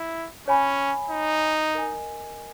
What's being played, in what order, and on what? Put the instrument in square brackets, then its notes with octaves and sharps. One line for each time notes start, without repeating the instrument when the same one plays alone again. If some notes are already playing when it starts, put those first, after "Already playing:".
Already playing: [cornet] E4
[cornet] C#4 [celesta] C#5 G#5 B5
[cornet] D#4
[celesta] A#4 D#5 G#5